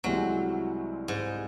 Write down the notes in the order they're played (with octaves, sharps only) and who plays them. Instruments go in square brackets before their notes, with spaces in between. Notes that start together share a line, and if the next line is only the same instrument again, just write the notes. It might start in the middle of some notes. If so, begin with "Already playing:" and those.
[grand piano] C2 C3 E3 G#3 C4 [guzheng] F#3
[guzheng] G#2